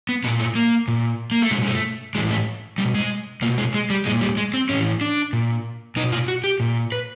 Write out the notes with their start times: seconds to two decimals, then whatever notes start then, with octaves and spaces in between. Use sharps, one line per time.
0.09 B3
0.24 A#2 B3
0.39 A3
0.55 A#3
0.88 A#2
1.32 A#3
1.42 A3
1.51 B2 G#3
1.62 G#3
1.68 A3
2.15 A2 E3 G#3
2.31 A3
2.78 B2 G3
2.94 G#3
3.42 B2 A#3
3.58 G#3
3.75 G#3
3.90 G3
4.05 A#2 G#3
4.21 G3
4.37 G#3
4.54 C4
4.69 A2 E3 C#4
5.01 D4
5.33 A#2
5.96 B2 D#4
6.12 F4
6.28 F#4
6.44 G4
6.60 A#2
6.92 B4